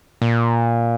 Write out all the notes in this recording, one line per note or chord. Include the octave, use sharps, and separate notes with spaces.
A#2